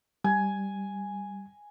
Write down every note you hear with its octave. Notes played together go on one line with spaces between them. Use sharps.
G3 G#5